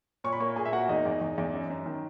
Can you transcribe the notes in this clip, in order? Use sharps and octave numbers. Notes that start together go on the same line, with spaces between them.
A#2 C#5 C#6
B5
A#3 C#5 C#6
A#2 G#4 G#5
E5
A#3 F#4 F#5
E2 D#4 D#5
E2
E2
E2
F#2
F#2
D#3